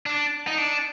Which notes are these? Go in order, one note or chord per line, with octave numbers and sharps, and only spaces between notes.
D4
D#4
D4